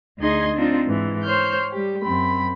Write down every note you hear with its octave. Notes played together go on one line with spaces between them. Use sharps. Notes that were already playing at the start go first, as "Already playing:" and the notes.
D2 D#4 G#4 D#5 C6 G#6
C4 D4 D#4 F4
G#2 E3
C5 C#5 F6 G6
G3 G4
F#2 C4 B5